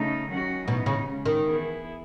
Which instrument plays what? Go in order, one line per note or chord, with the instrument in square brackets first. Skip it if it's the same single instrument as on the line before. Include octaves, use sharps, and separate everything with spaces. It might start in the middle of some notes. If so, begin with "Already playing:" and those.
Already playing: [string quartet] C#3 A3 D#4
D#3 F#3 C#4 F#4
[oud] B2 [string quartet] E3 B3 D#4
[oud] C#3
[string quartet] C#3 G#3 C#4
[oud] D#3
[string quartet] E3 B3 E4 G#4